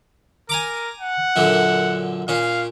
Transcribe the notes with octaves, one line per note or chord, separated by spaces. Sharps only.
A#4 G#5 A#5 D6
F#5
F#2 A#2 D3
A#2 C#4 F5